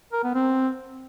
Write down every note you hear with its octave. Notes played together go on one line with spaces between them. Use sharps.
A#4
B3
C4